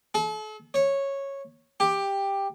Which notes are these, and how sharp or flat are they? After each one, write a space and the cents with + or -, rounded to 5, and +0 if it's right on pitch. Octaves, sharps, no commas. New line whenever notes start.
A4 -40
C#5 -10
G4 +10